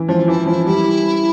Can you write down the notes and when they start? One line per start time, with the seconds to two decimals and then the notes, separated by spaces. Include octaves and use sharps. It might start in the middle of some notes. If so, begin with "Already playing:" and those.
Already playing: E3
0.09 F3 F4
0.28 E3 E4
0.46 F3 E4
0.66 G3 E4